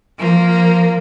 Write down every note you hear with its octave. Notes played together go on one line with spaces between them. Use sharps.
F3 A#3